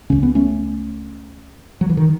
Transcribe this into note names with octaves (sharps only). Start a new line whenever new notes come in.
C#2 C#3 C#4
B3
A3 C#4
F#3
E3
D#3